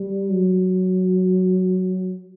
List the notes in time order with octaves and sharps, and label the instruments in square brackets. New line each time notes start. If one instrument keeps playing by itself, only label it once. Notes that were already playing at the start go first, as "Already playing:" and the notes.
Already playing: [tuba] G3
F#3